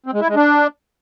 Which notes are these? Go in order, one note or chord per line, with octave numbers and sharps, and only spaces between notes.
C4
G#3
E4
G#3
D4